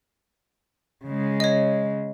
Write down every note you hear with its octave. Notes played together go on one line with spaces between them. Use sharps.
C#3 G#3
C#5 D#5